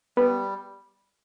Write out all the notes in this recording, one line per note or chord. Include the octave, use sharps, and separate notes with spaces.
G3 B3